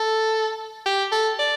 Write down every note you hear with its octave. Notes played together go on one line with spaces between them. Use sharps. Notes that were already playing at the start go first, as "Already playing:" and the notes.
Already playing: A4
G4
A4
D5